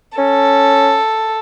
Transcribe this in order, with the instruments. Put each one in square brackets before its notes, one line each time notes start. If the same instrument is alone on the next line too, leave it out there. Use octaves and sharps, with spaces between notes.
[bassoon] C#4 [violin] A4